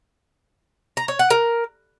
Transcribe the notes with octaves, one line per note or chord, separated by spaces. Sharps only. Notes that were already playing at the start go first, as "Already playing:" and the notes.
A#5
C#5
F#5
A#4